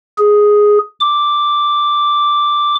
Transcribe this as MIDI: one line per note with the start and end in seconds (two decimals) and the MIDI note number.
0.18 0.78 68
1.00 2.75 86